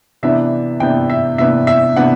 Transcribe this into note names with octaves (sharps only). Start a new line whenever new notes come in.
C3 E3 B3 D4 E5
C3 E3 B3 D4 G5
E5
C3 E3 B3 D4 E5
E5
C3 E3 B3 D4 F#5